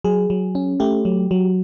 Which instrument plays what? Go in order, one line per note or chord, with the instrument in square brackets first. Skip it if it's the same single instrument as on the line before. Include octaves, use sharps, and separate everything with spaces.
[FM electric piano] F#3 G#4
F#3
C#4
A3 G4
F#3
F#3